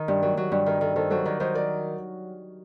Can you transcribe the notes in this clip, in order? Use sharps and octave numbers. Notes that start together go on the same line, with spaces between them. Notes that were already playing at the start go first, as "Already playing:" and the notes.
Already playing: D#3
G2
F#3 A#4 D5
F#3
G2
D#3 A#4
D#3 A4
D#3 A4 C5
F#3 A4 C5
D#3 A#4 D5
D#3 C5 D#5
A#4 D5